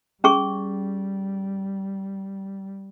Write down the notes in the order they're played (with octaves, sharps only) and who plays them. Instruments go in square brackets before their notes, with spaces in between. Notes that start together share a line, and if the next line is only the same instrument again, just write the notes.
[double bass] G3 [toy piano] C#4 G#4 C#6